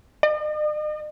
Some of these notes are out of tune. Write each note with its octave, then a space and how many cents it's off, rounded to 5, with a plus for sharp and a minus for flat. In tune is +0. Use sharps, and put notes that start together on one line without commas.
D#5 -45